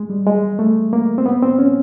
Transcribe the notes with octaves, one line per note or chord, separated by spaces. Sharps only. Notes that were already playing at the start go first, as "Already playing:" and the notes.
Already playing: G#3
G3
G#3
A3
A#3
C4
B3
C4
C#4